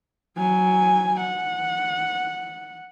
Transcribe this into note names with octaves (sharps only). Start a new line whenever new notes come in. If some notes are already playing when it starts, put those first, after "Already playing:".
F#3 G#5
F#5